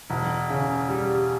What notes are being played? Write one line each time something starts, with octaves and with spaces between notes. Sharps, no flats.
E1
C#3
G3